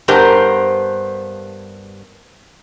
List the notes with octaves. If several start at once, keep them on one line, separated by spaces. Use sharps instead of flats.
G2 B3 G4 A#4 C5 A5